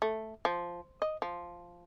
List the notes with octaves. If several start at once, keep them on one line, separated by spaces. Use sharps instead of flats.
A3
F3
D#5
F3